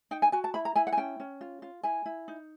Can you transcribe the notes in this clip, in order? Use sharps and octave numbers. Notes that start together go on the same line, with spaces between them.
D#4 G5
G#5
F#4 G#5
A5
E4 B5
A#5
E4 G#5
F#5
G#5
C#4 G5
C#4
F4
F4
E4 G#5
E4
D#4